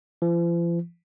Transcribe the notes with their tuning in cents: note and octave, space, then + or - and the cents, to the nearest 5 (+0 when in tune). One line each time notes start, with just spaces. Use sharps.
F3 -45